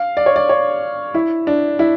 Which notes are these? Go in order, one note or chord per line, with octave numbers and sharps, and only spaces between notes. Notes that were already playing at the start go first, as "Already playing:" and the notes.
Already playing: F5
D5
C#5
D5
C#5
E4
D4
E4